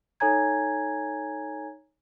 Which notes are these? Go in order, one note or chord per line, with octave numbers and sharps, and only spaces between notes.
D#4 A4 C#5 G#5 A#5 G#6